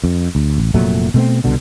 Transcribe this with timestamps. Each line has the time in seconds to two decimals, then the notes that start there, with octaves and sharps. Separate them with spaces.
0.04 F2
0.35 D2
0.58 A1
0.74 F1 A#2 F#3 A3
1.14 B2 A3 C4
1.44 C2 B2 D3